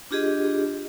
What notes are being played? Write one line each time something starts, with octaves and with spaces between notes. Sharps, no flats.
D4 F4 G4 G#4 D#5